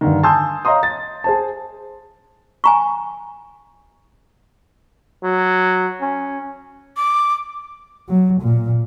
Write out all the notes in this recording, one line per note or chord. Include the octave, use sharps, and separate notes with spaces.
G2 D3 D#3
G#5 A5 C6 D#6 E6 G6
C#5 D#5 F5 A#5 C6 D#6
A6
G#4 C5 A5
G#5 A#5 C#6
F#3
C#4
D6
F#3
A#2